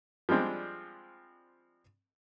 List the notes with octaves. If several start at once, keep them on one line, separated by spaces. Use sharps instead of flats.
F3 G3 G#3 C4 D4